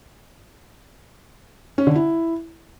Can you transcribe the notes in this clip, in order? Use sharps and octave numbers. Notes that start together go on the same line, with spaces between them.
C#4
D3
E4